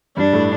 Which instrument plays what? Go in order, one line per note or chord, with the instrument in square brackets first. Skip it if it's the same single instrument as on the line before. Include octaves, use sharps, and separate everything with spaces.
[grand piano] G2 G3 [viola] D4
[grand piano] A2 A3